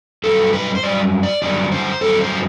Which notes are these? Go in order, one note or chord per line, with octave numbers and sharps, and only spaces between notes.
G2 F#3 A4
B4
C5
G2 F#3 D5
D5
G2 D3 F#3 D5
C5
G2 D3 F#3 A4
C5